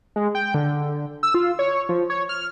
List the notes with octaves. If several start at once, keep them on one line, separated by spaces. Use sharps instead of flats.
G#3
G5
D3
E6
F4
C#5
F3
C#5
F6